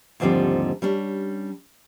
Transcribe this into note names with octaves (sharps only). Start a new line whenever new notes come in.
D#2 G#2 D3 F3 G3 C4
G3 C#4 D4